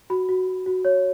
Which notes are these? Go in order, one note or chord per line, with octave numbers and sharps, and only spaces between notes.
F#4 B5
F#4
F#4
F#4
C#5